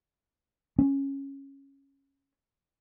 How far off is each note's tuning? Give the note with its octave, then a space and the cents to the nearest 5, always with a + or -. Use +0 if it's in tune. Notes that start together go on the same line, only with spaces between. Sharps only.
C#4 -10